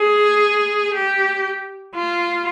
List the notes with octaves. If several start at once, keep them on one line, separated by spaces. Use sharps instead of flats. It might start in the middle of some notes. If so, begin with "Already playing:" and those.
Already playing: G#4
G4
F4